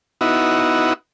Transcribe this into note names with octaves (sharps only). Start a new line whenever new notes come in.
B3 D#4 E4 F#4